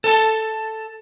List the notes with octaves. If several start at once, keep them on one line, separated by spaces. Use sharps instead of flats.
A4 A5